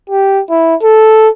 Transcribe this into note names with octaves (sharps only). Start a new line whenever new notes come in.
G4
E4
A4